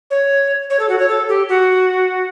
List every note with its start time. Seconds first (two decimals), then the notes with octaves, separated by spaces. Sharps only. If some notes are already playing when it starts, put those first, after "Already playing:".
0.10 C#5
0.70 C#5
0.79 A4
0.89 F#4
0.99 C#5
1.09 A4
1.29 G4
1.49 F#4